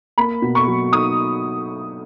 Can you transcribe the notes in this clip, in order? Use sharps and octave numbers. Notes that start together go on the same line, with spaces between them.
A#3 B5
B2
C#6
F#3
D#4 D#6